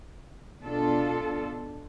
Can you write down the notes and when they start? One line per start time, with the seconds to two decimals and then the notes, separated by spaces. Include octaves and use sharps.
0.62 B2 D4 F4 A4